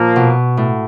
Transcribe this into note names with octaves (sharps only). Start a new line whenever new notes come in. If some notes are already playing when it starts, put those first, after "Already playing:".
Already playing: A#2 F3 A#3
B2
A2